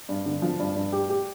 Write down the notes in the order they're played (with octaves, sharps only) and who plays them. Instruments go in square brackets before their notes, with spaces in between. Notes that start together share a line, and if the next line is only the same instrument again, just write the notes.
[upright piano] G2
D3
F3
G2
G2
G4
G4